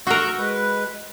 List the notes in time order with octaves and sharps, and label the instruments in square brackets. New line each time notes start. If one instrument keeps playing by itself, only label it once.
[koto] F#4 A#4 [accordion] C#6 E6 G6
[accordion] G#3 B4